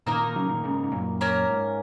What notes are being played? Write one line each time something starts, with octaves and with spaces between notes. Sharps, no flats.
A#2 D#3 A#3 D#4 A#4
A#2 D#3
C#3 F#3
A#2 D#3
G#2 C#3
G#2
F#2 A#2
A#3 C#4 A#4
G#2